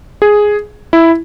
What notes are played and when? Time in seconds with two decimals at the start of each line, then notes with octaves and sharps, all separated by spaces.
0.22 G#4
0.93 E4